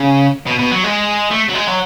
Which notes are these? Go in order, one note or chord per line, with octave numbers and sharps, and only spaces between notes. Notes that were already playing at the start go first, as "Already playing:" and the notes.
Already playing: C#3
B2
B2
F#3
G#3
A3
F#3
G#3
F#3